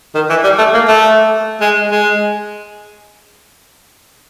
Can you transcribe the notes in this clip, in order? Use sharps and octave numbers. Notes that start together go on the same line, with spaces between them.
D#3
E3
G3
A3
A#3
A3
G#3
G#3